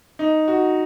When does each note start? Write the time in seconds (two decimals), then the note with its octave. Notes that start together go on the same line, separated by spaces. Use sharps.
0.19 D#4
0.48 F#4